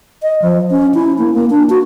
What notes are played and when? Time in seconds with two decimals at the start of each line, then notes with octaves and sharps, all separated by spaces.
0.23 D#5
0.42 F3
0.71 C#4
0.94 E4
1.18 A#3
1.34 A#3
1.50 D4
1.70 F#4